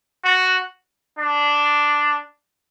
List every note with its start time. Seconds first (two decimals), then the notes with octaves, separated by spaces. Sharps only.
0.25 F#4
1.19 D4